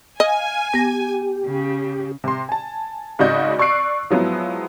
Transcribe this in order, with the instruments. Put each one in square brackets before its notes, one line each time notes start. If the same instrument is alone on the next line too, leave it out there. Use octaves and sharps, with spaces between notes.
[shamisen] D#5 [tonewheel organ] F5 [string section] G#5
[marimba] B3 A#6 [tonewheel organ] G4
[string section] C#3
[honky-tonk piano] C3 C6
G#5 A5
G#2 C#3 F#4 D5 D#5 G6
D5 C#6 E6 F#6 C7 D7
F3 F#3 G#3 B3 E4